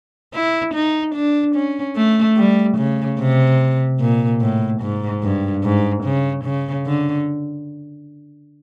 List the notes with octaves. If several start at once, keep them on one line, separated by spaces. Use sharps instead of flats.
E4
D#4
D4
C#4
A3
G3
C#3
C3
A#2
A2
G#2
G2
G#2
C#3
C#3
D3